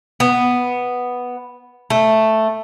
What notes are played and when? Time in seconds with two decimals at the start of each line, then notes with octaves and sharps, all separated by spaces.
0.20 B3
1.90 A3